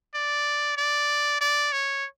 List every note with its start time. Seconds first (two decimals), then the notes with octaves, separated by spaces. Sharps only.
0.14 D5
0.77 D5
1.41 D5
1.72 C#5